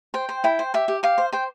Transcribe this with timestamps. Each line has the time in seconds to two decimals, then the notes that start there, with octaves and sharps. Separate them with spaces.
0.14 C5 G5
0.29 C5
0.44 E4 G5
0.59 C5
0.74 G4 E5
0.88 G4
1.03 G4 F5
1.18 C5
1.33 C5 G5